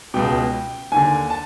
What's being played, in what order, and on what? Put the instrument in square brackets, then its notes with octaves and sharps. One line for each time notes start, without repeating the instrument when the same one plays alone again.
[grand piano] C#2 B2 G5
D#2 D3 G#5
A5